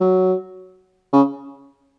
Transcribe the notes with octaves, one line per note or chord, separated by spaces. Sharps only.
F#3
C#3